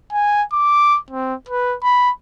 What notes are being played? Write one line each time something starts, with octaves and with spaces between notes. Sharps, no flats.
G#5
D6
C4
B4
B5